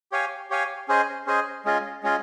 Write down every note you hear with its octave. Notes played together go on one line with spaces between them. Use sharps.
G4 C#5 F5 G#5
G4 C#5 F5 G#5
C#4 G#4 C5 D#5 G#5
C#4 G#4 C5 D#5 G#5
G#3 C#4 F4 G#4 D#5
G#3 C#4 F4 G#4 D#5